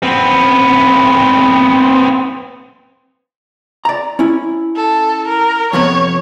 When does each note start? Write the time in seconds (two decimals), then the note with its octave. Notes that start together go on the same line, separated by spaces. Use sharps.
0.03 B3 C4
3.85 D5 A#5
4.19 C#4 E4
4.76 A4
5.28 A#4
5.73 F2 C3 B3 C#5